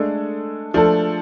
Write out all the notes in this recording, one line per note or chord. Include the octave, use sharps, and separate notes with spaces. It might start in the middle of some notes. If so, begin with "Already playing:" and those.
Already playing: G#3 A3 D4 A4
F3 A3 D4 A4